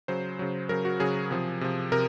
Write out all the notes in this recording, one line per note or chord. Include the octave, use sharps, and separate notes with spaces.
C#3 F#3 C5
C#3 F#3
C#3 F#3 A#4
F#4
C#3 F#3 G#4
C3 F3
C3 F3
C3 A#4